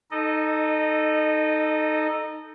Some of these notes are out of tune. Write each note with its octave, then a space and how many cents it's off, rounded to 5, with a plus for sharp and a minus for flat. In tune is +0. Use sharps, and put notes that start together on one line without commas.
D#4 +0 A4 +0 D#5 -25